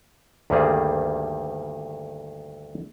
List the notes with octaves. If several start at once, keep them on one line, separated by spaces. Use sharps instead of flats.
D2 G2 D#3 G3 A#3 G#4